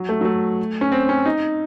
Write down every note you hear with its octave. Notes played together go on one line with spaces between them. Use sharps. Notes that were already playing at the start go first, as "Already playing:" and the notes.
Already playing: F#3
A3
F#3
A3
C#4
C4
C#4
D#4